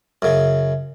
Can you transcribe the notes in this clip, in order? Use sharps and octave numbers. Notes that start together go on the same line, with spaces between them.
F#2 C#3